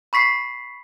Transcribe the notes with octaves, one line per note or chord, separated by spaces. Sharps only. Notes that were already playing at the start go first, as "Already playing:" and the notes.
B5 C#6 B6 C7